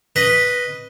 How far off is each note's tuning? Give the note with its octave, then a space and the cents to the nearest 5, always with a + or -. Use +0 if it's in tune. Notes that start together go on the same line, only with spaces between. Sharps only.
B4 -5 D#5 +0